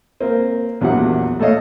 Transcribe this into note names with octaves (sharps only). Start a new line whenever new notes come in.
A#3 C4
A#1 E2 F#3 G4 F#5
A3 A4 C#5 D#5 F5